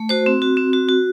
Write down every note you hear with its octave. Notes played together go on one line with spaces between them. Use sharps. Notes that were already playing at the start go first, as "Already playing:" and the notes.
Already playing: A3
F#4 C5
C4
F#4
C4
F#4
F#4